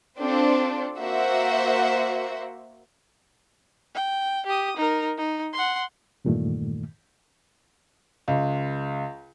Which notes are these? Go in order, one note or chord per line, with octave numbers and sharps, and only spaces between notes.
C4 D4 F4 A4 C5
A#3 F#4 C5 E5 F#5
G5
G4 D#6
D#4 A#4
D#4
F#5 C6
E2 G2 A#2 D#3 A3
C#2